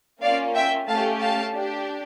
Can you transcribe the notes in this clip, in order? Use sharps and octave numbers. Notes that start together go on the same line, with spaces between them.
A#3 C#4 F4 D5 F5
E5 G5
A3 C#4 G4 F5 A5
F5 A5
D4 G4